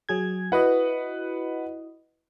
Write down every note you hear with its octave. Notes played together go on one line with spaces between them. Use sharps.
F#3 G#4 G#6
E4 F#4 B4 D#5 F#5